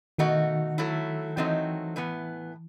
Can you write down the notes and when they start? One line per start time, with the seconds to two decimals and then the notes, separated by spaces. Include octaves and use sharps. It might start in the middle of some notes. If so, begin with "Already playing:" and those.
0.18 B2 D#3 A3 D#4 F#4
0.78 F#3 A3 E4
1.37 D#3 E3 F#3 A3 C4 D#4
1.96 A2 E3 B3